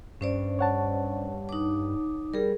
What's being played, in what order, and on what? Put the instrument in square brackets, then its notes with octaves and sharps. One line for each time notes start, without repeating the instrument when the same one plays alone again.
[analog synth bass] G2 [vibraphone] C#4 C5 D5
[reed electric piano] C#5 F#5 A5
[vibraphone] D#4 D6
[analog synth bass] G3 [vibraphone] G#4 A#4